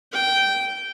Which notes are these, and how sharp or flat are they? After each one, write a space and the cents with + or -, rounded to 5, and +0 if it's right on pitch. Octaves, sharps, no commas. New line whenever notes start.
G5 -15